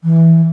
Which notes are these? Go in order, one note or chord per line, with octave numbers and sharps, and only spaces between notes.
E3